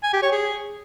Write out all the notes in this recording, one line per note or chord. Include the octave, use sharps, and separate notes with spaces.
G#5
G4
C#5
G#4